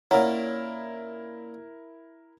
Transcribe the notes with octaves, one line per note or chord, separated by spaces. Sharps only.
A#2 C#4 E4 A#4 C#5 F#5 A#5